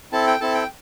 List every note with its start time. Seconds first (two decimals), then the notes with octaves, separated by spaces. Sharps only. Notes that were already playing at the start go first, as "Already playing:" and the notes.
0.12 C4 E4 A4 A5
0.27 G5
0.41 C4 E4 A4 A5
0.54 G5